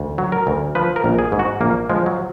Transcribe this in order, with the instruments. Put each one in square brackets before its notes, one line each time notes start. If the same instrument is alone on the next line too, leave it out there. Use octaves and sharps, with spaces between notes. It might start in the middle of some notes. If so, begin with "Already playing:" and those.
Already playing: [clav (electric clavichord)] D2
F#3
A#4
D2
F3 B4
A#4
A#1
G#4
G#2
F#4
A#1 A#3
F3 G#3
F#3